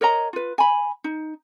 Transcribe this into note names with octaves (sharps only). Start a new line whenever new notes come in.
A#4 C#5 D#5 A#5
F4 B4
G#5 B5
D#4